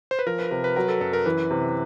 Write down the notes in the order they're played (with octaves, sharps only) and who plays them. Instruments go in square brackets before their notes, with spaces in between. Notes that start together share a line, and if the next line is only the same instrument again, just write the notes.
[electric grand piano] C5
B4
[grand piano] F3 [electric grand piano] A#4
[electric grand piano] B4
[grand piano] C3 [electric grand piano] B4
[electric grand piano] B4
[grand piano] F#3 [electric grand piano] A#4
[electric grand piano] A4
[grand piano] F#2 [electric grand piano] A4
[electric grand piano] A#4
[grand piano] E3 [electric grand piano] B4
[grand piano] C3